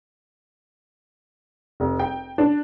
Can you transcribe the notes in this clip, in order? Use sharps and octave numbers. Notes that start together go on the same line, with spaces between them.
F1
G5
D4